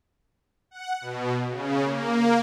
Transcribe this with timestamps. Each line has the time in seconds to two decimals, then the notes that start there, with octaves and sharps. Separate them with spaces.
0.71 F#5
1.01 B2
1.50 C#3
1.83 A#3